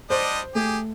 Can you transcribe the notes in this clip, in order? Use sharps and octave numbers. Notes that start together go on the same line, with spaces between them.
G3 D4 C5 D#5
A3 G4 G#4